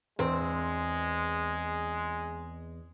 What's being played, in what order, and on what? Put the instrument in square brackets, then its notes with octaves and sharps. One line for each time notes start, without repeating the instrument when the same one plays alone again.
[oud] E2 C4 [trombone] G#3